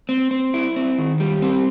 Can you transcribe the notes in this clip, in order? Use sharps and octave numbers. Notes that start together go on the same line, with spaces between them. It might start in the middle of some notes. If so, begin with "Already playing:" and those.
C4
C4
E4
C4
D#3
G3
C4